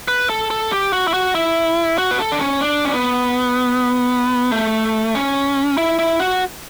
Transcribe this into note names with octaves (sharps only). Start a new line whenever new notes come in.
B4
A4
A4
G4
F#4
E4
F#4
E4
F#4
B4
A4
D4
C#4
D4
C#4
B3
A3
C#4
E4
E4
F#4